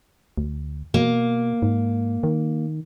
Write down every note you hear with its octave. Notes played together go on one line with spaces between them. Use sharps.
D2
B2 A#3
G#2
D#3